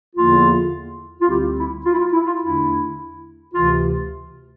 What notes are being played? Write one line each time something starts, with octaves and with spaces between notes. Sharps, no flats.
E2 D3 F3 A#3 E4 F4
F4
D2 D3 G3 C4 E4 G4
E4
F4
E4
F4
E4
F4
E2 D3 A3 D4 E4
D2 C3 E3 F4